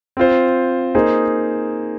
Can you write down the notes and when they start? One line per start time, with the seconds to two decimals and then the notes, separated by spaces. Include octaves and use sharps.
0.17 C4 F4 C5
0.95 A#3 D#4 G#4 C5